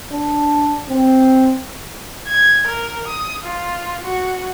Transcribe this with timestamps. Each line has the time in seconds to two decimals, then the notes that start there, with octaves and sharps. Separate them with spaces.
0.12 D4
0.90 C4
2.27 G#6
2.67 A#4
3.07 D#6
3.44 F4
4.03 F#4